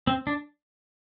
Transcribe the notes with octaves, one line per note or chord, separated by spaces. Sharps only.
C4
D4